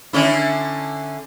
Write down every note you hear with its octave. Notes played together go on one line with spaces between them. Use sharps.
D3 C#4 E4